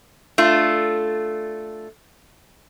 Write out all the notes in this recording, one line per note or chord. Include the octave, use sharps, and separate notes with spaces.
A3 D4 F4